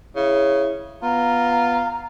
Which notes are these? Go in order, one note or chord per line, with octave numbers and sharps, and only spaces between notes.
C#3 E4
B3 F4 A#5